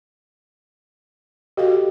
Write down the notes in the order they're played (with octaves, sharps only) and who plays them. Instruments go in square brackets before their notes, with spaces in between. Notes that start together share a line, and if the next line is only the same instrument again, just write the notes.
[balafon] F#4 A4 F5 [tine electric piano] G4 D#5